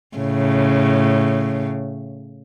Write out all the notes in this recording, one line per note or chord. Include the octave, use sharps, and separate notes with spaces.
A2 C#3